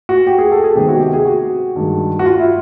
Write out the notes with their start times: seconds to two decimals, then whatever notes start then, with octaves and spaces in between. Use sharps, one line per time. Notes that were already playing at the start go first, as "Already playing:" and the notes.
0.09 F#4
0.27 G4
0.38 G#4
0.52 A4
0.64 G#4
0.75 C3 D#3 G#3 B3 G4
0.88 F#4
1.00 G4
1.13 G#4
1.25 F#4
1.76 G2 D#3 G#3
2.19 F#4
2.25 F4
2.39 E4